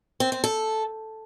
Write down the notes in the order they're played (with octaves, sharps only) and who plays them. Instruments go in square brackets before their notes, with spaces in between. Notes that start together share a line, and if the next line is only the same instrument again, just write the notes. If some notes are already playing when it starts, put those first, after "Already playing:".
[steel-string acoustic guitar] C4
C4
A4